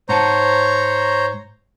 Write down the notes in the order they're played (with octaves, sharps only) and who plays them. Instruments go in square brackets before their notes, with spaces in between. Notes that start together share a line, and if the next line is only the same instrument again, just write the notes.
[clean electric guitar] G#2 F#5 A5 [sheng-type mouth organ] C5 C#5 A#5